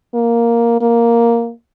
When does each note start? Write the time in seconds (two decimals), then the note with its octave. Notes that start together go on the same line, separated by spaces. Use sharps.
0.14 A#3
0.81 A#3